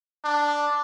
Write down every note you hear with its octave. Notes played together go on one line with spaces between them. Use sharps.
D4